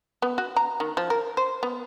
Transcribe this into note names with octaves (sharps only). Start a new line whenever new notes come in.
B3
F#4
A#5
D#3
F3
A#4
C5
B3